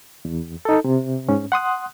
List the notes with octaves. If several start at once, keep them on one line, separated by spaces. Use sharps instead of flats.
E2
D#4 A4
C3
G#2 C#4
F#5 C6 D#6 F#6